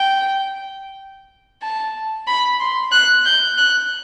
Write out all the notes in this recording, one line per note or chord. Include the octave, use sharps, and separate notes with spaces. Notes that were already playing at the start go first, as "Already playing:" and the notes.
Already playing: G5
A5
B5
C6
F#6
G6
F#6